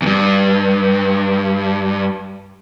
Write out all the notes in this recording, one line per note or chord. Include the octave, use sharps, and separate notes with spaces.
E2 G2